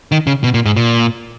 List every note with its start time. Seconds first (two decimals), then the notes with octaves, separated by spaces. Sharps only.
0.12 D#3
0.27 C#3
0.44 B2
0.54 A#2
0.65 G#2
0.76 A#2